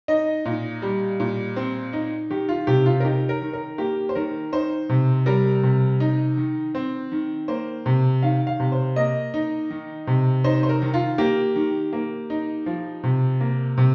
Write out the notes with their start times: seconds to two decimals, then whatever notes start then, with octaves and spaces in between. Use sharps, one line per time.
0.08 D#4 D#5
0.45 A#2
0.82 G3
1.20 A#2
1.56 C4
1.93 D#4
2.30 D#3 G4
2.49 F4
2.67 C3 G4
2.86 F4
3.00 A#4
3.04 D#4 G4
3.29 A#4
3.42 D#3
3.53 A#4
3.78 A#3 G4
4.09 C5
4.15 D#3 A#4
4.52 D#4 C5
4.89 C3
5.26 G3 A#4
5.63 C3
6.00 D#4
6.37 D#3
6.75 C4
7.12 D#3
7.48 A#3 C5
7.86 C3
8.22 D#3 F5
8.47 F5
8.60 C3
8.72 C5
8.96 A#3 D#5
9.34 D#4
9.70 D#3
10.07 C3
10.44 D#4 C5
10.63 C5
10.69 A#4
10.82 D#3
10.94 F4
11.18 A#3 G4
11.55 D#3
11.93 A#3
12.30 D#4
12.66 F3
13.03 C3
13.41 A#3
13.77 C3